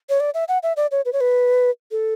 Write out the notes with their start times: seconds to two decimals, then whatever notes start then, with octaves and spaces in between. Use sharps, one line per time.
0.09 C#5
0.20 D5
0.34 E5
0.48 F#5
0.63 E5
0.77 D5
0.91 C#5
1.05 B4
1.13 C#5
1.20 B4
1.91 A4